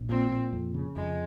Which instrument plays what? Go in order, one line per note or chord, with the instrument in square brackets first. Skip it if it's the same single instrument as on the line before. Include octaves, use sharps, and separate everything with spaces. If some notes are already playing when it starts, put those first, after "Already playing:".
Already playing: [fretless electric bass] A#1
[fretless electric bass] A#2 [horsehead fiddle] C4
[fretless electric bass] A#2
F2
C#3
[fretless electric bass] F2 [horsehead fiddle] G#3